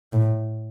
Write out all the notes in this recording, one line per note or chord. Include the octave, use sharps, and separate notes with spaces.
A2